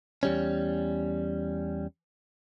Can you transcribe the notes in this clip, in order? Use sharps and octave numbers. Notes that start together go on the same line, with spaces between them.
E2 G3 C#4